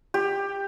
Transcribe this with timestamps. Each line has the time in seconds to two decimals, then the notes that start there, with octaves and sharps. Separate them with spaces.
0.14 G4